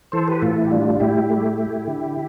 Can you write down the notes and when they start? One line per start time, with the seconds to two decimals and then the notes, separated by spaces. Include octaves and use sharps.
0.12 E3 A4 C5
0.28 G4 B4
0.41 A2 F4 A4
0.57 E4
0.65 G4
0.70 G3 D4 F4
1.00 A2 E4 G4
1.30 A3
1.58 A3
1.87 D3